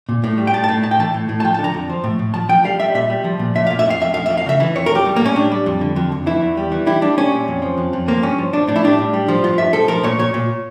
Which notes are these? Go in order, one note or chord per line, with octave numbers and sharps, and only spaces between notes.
A#2
A2
G3
G5
A2 A5
A5
A2
A2 A5
G5
E3 A5
A2
A2
A5
F3 G5
A5
D3
A#5
F2
F3
A2
A2
F3 A5
F3 G5
G3 F5
G3 E5
A#2 E5
G3
F3
A#2
A#2 E5
A#2 F5
E5
F2
F5
F2 E5
F2 F5
F2 E5
F5
C#3 E5
E3
F2 C#5
A#4
F2 G4
G3
A#3
A2 C#4
G3 D4
G3
F2
D3
F2
F2
E3 E4
E2
G3
E3
G3 E4
G3 D4
G3 C#4
A#2
F2
F3
F2
F2
F3 A#3
G2 C#4
F3
F3 D4
A2 D4
E4
G3 D4
A2
G3
F3
G2 F4
G2 E5
F3 A4
F3 A#4
A#2 C#5
A#2 C#5
A#2